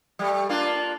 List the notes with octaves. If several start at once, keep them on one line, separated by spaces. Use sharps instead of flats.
G3 A3
A#3 D4 F4